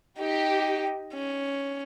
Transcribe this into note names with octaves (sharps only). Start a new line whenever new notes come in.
D#4 G4
C#4